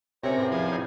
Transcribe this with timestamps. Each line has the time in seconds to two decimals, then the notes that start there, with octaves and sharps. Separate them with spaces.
0.23 C3 C4 C#4 G4 A#4 C#5
0.37 E2 A2
0.52 F3 G#4
0.72 D#4